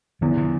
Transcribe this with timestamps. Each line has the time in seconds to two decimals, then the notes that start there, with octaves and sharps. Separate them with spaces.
0.21 E2 D3 F3
0.37 D3 F3